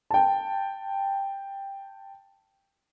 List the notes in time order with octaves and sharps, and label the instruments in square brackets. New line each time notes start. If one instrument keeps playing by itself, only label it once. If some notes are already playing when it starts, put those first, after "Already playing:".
[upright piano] G5 A5